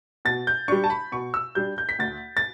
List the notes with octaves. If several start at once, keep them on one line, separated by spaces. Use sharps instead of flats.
B2 A6
G6
G3 D4 C#6
A5
B5
B2 C#6
E6
G3 D4 G6
G6
B6
D2 A6
A6